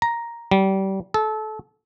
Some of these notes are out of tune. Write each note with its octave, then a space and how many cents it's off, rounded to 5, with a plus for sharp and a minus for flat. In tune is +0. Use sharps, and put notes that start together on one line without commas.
A#5 +5
G3 -25
A4 -25